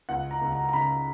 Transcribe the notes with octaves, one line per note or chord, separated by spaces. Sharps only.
C#2 F#5
A#5
C#2
A#5
A#5
C#3 B5